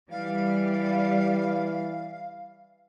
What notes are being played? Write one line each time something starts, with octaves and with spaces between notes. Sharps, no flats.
E3 G3 F5